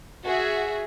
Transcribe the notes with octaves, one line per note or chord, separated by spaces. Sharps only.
F#4 G#4 E5